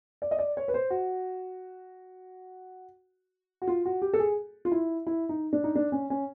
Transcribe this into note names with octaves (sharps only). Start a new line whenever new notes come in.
D5
D#5
D5
C#5
B4
C5
F#4
F#4
F4
F#4
G4
A4
G#4
F4
E4
E4
D#4
D4
D#4
D4
C#4
C#4